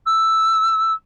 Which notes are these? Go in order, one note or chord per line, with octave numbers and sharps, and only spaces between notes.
E6